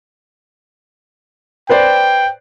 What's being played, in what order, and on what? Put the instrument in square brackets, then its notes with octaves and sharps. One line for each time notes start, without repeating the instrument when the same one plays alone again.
[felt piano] B4 C5 D5 [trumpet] G5